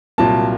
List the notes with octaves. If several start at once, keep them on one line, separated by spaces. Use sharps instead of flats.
C2 A#2 F#3 A#3 A5